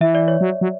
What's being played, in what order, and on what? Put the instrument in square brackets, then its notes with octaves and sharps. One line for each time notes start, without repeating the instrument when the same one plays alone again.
[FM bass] E3 [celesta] E5
[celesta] D5
C#5
[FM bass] F#3
F#3